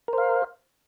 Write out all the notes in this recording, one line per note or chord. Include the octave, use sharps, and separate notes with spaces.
A#4 C5 F5